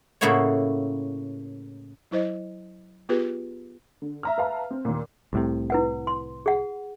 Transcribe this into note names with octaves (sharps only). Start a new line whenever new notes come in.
A2 C#3 A#3 E4 F#4 C#5
F#3 E4 C5 D#5
B3 F4 G4 G#4 B4
D3
E5 A#5 F6
B4 E5 F5 A5 A#5
C4
D#2 A#2
C2 A2 C3
E4 B4 F#5
C6
G#4 F#5